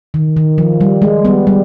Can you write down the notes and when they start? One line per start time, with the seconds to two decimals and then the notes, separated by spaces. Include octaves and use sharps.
0.14 D#3
0.37 D#3
0.58 F3
0.81 G3
1.02 G#3
1.25 G3 B3
1.47 G3